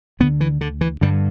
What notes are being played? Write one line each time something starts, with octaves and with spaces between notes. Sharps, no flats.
D2 D3 B3
E3
D3
E3
G2 D3 G3